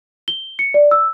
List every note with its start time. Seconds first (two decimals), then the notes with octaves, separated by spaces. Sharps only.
0.28 G7
0.59 C#7
0.74 D5
0.91 E6